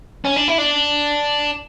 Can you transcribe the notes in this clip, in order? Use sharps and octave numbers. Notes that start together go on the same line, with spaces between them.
C#4
D4
E4
D4